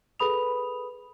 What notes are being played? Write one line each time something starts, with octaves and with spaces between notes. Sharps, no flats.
G#4 A4 B4 B5 D#6 F7